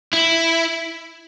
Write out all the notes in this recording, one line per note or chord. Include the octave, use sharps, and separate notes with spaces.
E4